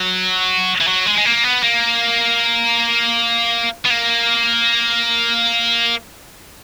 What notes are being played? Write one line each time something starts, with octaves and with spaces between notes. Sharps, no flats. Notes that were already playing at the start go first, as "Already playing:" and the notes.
Already playing: F#3
E3
F#3
G#3
G#3
A#3
B3
A#3
B3
A#3